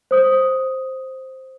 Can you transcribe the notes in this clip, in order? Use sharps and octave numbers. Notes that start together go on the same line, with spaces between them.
C5 D#6